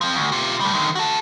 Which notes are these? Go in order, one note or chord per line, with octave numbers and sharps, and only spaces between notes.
F3 C4
D2
F4 G4
G3 A3
D3 D#3
F#4 A4